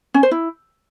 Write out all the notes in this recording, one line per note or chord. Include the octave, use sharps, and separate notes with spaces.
C#4
C5
E4